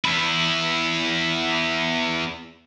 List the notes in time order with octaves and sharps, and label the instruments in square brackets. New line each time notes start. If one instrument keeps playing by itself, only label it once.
[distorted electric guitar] E2 E4